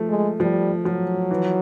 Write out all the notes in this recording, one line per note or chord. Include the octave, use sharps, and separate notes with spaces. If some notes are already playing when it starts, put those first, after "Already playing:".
Already playing: F3 A3
G#3
F3 G3
F3 F#3
E3